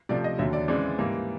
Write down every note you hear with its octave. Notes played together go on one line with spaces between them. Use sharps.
C3 F3 A3 D5
D#5
D#2 D3 F#3 E5
D5
C#3 E3 G#3 C4 D5
G#2 E3 G3 A#3